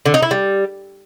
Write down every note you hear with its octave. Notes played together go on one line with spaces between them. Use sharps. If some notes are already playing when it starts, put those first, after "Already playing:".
D3
D#4
E4
G3